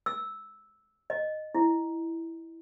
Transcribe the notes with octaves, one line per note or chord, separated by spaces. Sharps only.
E6
D#5
E4